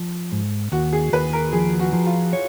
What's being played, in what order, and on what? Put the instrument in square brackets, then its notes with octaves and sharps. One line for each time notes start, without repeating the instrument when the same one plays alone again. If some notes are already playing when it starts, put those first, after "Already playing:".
Already playing: [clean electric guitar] F3
G#2
[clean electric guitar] D#2 [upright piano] F#4
[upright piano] G#4
[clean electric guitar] D#2 [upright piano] B4
[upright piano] A#4
[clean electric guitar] F3 [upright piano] G#4
[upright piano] F#4
[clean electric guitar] F3
[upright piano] F4
[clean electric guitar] C#5